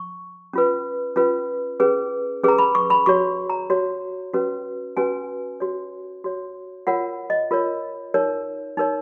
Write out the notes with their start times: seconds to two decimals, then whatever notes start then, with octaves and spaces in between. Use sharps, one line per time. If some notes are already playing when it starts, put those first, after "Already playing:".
Already playing: C#6
0.53 C#4 F4 B4
1.16 C#4 F4 B4
1.80 C#4 G#4 B4
2.44 C#4 G#4 B4 A#5
2.58 B5
2.75 C#6
2.90 B5
3.06 F#4 C#5 C#6
3.50 A#5
3.70 F#4 C#5
4.34 C#4 F#4 B4
4.97 C#4 F#4 B4 G#5
5.60 F#4 C#5
6.24 F#4 C#5
6.87 F4 A#4 C#5 F#5
7.30 D#5
7.51 F4 A#4 C#5
8.14 D#4 A#4 C#5
8.77 D#4 A#4 C#5